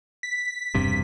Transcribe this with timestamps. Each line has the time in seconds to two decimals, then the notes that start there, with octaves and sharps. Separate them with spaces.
0.23 B6
0.75 E1 G2 C3